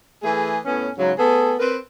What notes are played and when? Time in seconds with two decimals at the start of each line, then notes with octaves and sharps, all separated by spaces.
0.22 E3 A3 G#4
0.65 A2 B3 C#4
0.98 G#2 C#3 F#3
1.18 A3 B3 G#4 A4
1.59 C4 A#4 B4